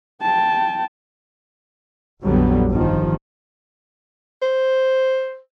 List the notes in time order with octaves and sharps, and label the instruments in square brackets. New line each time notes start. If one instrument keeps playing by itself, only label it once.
[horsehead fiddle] G5 A5
[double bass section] A#1 F2 D3 F#3 G3 B3
G1 D#3 F3
[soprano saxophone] C5